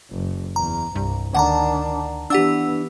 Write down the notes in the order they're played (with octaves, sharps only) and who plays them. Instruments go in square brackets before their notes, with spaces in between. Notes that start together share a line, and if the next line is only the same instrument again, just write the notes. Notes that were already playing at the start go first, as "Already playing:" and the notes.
[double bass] F#1
[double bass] E2 [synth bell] A#5
[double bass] C2 [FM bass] G2
[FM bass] D2 [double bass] D#3 D4 [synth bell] F#5 A5 A#5
[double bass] E3 B3 [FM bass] D4 [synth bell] G4 F#5 E6